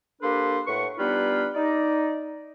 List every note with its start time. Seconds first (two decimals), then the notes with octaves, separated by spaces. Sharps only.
0.21 A#3 D4 G4 A4 B4 C5
0.66 A2 B4 F#5 C#6
0.98 G3 B3 D4 D#4 F4 B4
1.54 D#4 D5